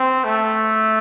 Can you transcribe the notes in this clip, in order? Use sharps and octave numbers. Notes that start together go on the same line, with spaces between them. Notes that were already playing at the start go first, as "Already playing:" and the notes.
Already playing: C4
A3